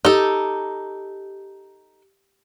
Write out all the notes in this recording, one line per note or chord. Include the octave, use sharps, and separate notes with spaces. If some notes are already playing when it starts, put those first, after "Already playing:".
D#4 G4 A4